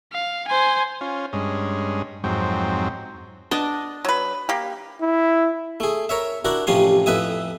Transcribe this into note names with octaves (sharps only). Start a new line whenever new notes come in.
F5
C5 G#5
C#4 F4
G2 G#3 C#4
F2 G#2 F#3 C4
B3 D4 D#5
F#3 B4
A#3 G4
E4
A3 G#4
A#4 C#5 E5
D4 E4 F#4 A#4
A1 C3 F3 C#4 G#5 C6
F2 A2 B4 E5 G#5 D#6